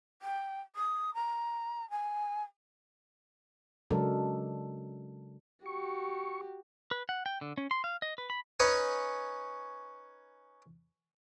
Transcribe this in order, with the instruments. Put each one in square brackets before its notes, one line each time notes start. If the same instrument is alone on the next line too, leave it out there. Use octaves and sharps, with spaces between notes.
[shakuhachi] G5
D#6
A#5
G#5
[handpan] C#3 F#3 G#3 D4 A4 A#4
[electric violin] F#4 G4 [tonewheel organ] C#6
[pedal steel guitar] B4
F#5
G5
D3
C#4
C6
F5
D#5
B4
B5
[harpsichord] C#4 D#4 B4 C#5 G#5